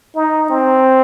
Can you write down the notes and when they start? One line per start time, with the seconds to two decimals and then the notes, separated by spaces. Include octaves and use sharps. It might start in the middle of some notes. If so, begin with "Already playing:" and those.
0.15 D#4
0.50 C4